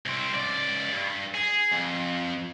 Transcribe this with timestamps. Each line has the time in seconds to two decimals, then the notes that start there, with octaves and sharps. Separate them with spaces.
0.06 C2 C4
0.32 C#2 D5
0.92 G2
1.35 G#4
1.72 F2